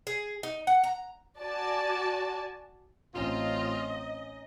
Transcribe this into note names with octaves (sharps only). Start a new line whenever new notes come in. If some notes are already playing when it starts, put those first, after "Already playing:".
G#4
D#4
F#5
A#5
F#4 D5 G#5 A5
A1 C4 C#4 D#4 F4 D#5 F5